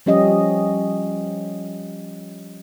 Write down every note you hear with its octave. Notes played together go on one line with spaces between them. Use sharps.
F3 G3 C#4 G4 D#5